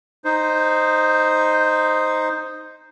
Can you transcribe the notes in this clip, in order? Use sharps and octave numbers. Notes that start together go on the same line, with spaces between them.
D#4 C5